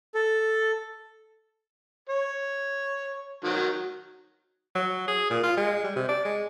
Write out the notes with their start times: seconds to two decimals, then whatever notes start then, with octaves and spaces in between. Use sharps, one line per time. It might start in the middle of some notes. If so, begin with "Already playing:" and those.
0.15 A4
2.09 C#5
3.44 D#3 F#3
4.76 F#3
5.08 G#4
5.30 A#2
5.43 F4
5.57 G#3
5.84 G3
5.96 C3
6.09 D5
6.25 G#3